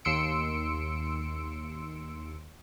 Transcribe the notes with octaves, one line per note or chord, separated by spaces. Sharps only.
D#2 C6 E6 C#7 D7